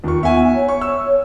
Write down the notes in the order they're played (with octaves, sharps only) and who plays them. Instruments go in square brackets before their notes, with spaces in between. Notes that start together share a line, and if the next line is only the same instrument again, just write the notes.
[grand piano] D#2 C#6 [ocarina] F4
[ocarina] B3 [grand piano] E5 F#5 G#5
[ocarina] C#5
[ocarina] C#5 [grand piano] C#6
[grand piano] E6